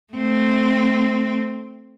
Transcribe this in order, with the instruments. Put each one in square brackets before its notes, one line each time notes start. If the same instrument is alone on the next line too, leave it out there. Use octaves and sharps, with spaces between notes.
[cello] A3 C4